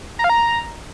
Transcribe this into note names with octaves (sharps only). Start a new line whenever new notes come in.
A#5
F5
A#5